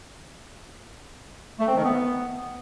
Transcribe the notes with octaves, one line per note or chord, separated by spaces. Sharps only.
A3
C4
D#3
B3